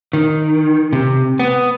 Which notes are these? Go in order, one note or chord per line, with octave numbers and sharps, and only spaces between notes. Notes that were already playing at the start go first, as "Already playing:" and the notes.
D#3
C3
B3